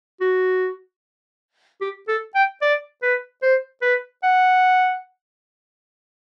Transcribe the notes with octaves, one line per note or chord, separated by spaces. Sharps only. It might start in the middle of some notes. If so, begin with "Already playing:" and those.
F#4
G4
A4
G5
D5
B4
C5
B4
F#5